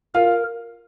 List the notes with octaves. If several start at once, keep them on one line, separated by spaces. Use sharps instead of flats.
F4 A#4 F5